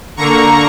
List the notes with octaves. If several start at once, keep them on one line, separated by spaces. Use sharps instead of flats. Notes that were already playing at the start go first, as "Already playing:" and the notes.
D3 A#3 A#5 C#6